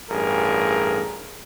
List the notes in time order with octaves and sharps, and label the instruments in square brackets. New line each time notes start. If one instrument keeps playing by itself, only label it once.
[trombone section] A1 G2 G#4 A#4